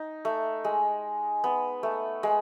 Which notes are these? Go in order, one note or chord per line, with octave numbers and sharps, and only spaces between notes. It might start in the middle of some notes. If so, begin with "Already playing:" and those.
Already playing: D#4
A3
G#3
B3
A3
G#3